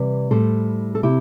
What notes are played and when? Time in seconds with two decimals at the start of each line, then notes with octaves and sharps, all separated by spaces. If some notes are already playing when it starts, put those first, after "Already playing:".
Already playing: C3 E3 G3 B4 D5
0.31 A2 G3 A4 C5
0.95 A4
1.03 C3 E4 G4